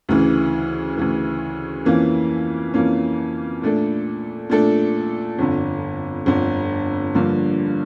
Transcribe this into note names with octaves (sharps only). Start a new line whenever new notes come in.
D2 C#3 E3
D2 C#3 E3
F2 E3 A#3 C#4
F2 E3 A#3 C#4
A#2 A3 D4 A4
A#2 A3 D4 A4
G1 F2 D3
G1 F2 D3
G2 D3 F3 A#3